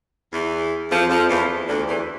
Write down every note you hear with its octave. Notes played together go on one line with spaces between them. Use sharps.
E2 E3
F2 F3
F2 F3
E2 E3
D2 D3
E2 E3